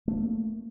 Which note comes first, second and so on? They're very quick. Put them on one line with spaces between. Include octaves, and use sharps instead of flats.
A3 C#4 A#3